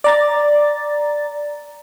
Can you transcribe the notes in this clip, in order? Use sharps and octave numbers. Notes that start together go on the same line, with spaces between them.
D5 A#5 A6